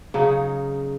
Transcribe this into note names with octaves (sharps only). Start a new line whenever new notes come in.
C#3 F#3 D#4